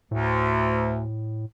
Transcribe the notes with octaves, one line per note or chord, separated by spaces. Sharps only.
D2 A2